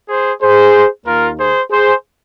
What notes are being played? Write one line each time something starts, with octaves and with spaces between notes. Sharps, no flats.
G#4 C5
G#4 C5
D#2 D#3 A#3 F4 A#4
G#4 C5
G#4 C5